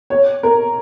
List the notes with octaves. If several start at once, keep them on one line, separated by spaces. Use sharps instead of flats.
C#5
A#4